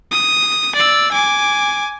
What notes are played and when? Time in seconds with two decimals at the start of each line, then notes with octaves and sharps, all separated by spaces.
0.12 D#6
0.75 D5 E6
1.12 G#5 D6